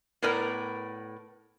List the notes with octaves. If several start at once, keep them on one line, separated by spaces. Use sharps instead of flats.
A2 B3 A#4 B4 D5 A#5